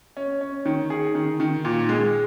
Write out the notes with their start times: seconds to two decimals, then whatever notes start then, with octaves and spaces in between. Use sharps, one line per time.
0.17 C#4
0.41 C#4
0.65 D#3
0.90 G#4
1.15 D#3
1.40 D#3
1.65 A#2
1.89 G#3